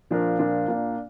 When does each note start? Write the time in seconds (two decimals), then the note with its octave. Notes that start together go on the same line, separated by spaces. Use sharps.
0.11 A#2 F3 D4 A#4
0.39 A#2 F3 D4 A#4
0.68 A#2 A#3 D4